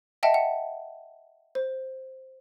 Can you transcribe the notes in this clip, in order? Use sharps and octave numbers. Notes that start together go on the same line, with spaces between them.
D#5 E5 F#5 G5 A5
F#5
C5